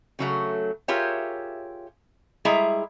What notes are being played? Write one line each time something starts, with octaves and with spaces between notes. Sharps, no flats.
C#3 F#3 A3
F4 G4 G#4 A#4 C#5 E5
G3 G#3 E4 G#4 E5 A#5